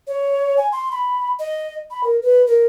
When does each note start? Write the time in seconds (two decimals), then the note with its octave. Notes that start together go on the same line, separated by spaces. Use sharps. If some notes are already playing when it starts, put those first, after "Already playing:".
0.07 C#5
0.57 G#5
0.72 C6
0.92 B5
1.39 D#5
1.90 B5
2.03 A#4
2.22 B4
2.47 A#4